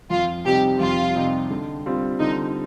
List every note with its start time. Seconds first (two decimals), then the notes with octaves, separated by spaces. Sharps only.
0.10 F2 F4
0.45 C3 G3 C4 D#4 G4
0.80 F2 F4
1.15 C3 G3 C4 D#4
1.51 D3
1.86 G3 C4 F4
2.20 D3 D#4